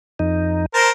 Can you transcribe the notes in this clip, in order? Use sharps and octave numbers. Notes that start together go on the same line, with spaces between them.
F2 D#4
A#4 C5 A5